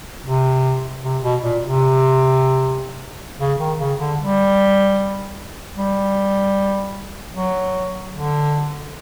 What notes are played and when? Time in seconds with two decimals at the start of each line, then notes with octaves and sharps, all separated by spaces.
0.24 C3
1.03 C3
1.22 B2
1.42 A#2
1.62 C3
3.40 C#3
3.59 D#3
3.79 C#3
3.99 D3
4.18 G3
5.76 G3
7.34 F#3
8.13 D3